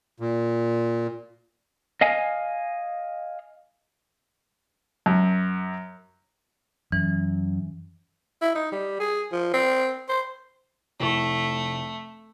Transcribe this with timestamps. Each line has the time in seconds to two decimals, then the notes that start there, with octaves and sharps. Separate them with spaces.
0.20 A#2
2.01 D#5 F5 G#5
5.06 F#2
6.92 F#2 E3
8.42 E4
8.55 D#4
8.72 G3
9.00 G#4
9.32 F3
9.54 C4
10.09 C5
11.00 F1 A3 E4 C#6